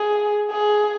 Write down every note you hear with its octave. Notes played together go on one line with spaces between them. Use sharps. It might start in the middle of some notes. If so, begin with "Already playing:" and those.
Already playing: G#4
G#4